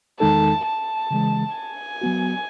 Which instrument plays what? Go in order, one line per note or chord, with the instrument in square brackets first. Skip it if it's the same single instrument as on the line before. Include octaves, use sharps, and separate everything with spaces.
[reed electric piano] E2 D#3 G#3 D#4 A4 [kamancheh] A5
[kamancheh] A5
[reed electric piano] C#3 E3 G#3
[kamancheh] G#5
[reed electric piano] F#3 B3 F#4